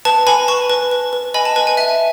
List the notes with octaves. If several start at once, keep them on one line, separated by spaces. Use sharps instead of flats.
B4 A5
B4 G#5 B5
B4 A5 C#6
B4
B4
B4
D#5 G#5 B5
A5
B4 G#5
G#5
E5 A5